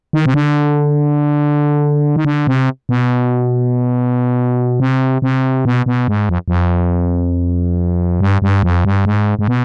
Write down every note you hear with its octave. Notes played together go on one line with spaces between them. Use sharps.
D#3
C3
D3
D#3
D3
C3
B2
C3
C3
B2
B2
G#2
F2
F2
G2
G2
F2
G2
G#2
G#2
B2